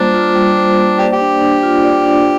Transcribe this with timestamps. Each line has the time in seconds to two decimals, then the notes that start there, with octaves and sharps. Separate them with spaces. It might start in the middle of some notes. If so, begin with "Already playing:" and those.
Already playing: G3 A#3 D4 F4 C5
0.14 F4
0.35 G3
0.57 C5
0.77 A#3
0.99 G4 D5
1.13 G4
1.20 D4
1.41 D4
1.63 F4
1.84 D5
2.05 D4